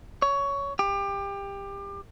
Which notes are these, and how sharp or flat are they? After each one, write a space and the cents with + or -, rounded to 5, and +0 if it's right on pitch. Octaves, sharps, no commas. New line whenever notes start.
C#5 +15
G4 +25